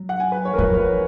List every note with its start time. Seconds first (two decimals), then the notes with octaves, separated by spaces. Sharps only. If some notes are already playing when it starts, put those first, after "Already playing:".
Already playing: F#3
0.09 F#5
0.20 G#5
0.32 B4
0.45 C#5
0.53 A#4
0.58 F3 B4
0.74 C#5
0.79 B4